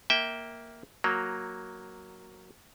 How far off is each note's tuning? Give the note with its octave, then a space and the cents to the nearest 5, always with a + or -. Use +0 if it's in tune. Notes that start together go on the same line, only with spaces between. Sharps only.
A#3 +0 E5 -15 G5 +0
F#3 +0 A#3 +0